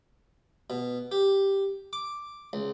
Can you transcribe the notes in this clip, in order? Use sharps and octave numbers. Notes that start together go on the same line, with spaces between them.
B2
G4
D6
C#2